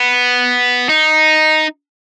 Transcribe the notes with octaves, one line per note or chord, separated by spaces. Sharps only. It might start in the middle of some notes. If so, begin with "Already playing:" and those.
Already playing: B3
D#4